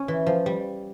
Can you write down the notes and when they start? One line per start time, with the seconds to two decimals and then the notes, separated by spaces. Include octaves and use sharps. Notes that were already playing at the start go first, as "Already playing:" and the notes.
Already playing: C#4
0.08 E3
0.27 F3
0.46 G3